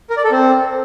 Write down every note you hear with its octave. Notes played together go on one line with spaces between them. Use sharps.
A#4
D5
A4
C4